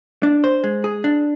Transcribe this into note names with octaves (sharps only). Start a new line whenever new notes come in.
D4
C5
G#3
G#4
D4